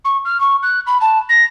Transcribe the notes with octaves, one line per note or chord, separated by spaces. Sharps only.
C#6
F6
C#6
F#6
B5
A5
A#6